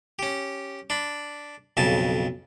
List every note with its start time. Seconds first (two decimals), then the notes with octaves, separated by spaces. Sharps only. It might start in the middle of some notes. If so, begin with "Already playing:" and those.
0.19 C#4 G4
0.90 D4 B5
1.77 B1 F2 C#3 G#5 A5